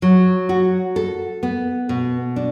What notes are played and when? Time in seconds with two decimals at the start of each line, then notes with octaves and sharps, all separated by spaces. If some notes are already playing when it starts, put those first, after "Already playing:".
0.02 F#3
0.49 F#4
0.96 A4
1.43 B3
1.89 B2
2.36 D4